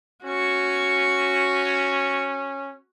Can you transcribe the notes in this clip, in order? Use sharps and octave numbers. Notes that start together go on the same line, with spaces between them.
C#4 F#4 C#6